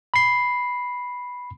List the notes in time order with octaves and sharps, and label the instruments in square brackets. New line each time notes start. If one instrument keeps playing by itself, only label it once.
[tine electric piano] B5 C7